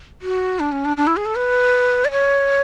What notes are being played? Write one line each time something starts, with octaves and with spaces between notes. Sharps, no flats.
F#4
D4
C#4
D4
D4
E4
G#4
A4
B4
D5
C#5